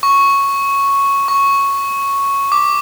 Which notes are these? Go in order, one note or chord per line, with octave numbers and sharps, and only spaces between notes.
C#6
C#6
D6